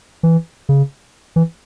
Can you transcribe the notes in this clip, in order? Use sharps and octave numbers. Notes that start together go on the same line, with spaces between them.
E3
C#3
E3